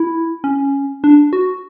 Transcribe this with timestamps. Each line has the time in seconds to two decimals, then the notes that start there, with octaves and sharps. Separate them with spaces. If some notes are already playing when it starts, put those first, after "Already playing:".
Already playing: E4
0.44 C#4
1.04 D4
1.33 F#4